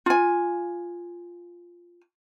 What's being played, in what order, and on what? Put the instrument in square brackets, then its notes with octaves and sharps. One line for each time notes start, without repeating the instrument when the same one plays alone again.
[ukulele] F4 G#5